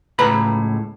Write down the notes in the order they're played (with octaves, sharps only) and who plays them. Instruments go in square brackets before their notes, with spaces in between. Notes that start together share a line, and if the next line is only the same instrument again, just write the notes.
[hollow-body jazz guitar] C#2 A2 B4 A#5 B5